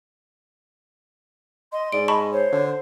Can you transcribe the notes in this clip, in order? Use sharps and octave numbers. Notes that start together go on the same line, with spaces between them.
D#5 C6
G#2 D5 D7
D#5 A5 B5 C#6
C5 C#5
D3